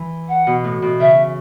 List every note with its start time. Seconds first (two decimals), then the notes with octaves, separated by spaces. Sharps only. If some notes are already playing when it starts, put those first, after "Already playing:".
Already playing: E3
0.28 F#5
0.47 B2
0.64 A2
0.82 B2
1.00 C#3 E5